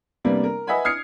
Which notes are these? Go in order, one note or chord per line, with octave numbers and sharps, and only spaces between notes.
C3 G3 A#3 B3 D4
A#4
B4 D#5 E5 F#5 G#5 B5
D#6 F6 G#6 C7 C#7